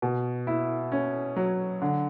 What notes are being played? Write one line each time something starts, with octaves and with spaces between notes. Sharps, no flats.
B2
E4
C#4
F#3
D3